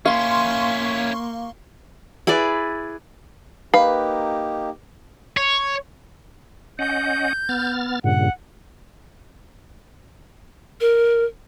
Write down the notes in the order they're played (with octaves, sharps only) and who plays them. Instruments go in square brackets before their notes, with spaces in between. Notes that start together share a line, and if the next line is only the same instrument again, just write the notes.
[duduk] A#3 [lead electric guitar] C#4 E4 [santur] F5 [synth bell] C6 C#6
[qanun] E4 G#4 B4 D5
[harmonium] A#3 D#4 G4 [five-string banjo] B4 [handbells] F5
[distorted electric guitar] C#5
[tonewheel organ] C#4 D#5 F#5 [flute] G6
[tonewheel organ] B3 F6 A6
[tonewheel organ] G2 A#2 C#3 [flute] F#5
[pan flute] A#4